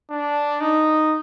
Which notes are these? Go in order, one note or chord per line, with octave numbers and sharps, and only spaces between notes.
D4
D#4